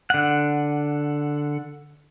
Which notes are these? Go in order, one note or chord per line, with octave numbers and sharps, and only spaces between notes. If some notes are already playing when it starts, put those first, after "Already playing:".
D3 F#5